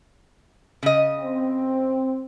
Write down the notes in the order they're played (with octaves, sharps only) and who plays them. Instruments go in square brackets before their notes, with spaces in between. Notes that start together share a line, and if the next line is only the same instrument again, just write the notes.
[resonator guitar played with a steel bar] C#3 D#5
[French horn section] C4